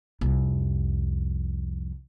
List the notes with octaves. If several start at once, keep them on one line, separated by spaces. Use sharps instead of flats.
C2 F2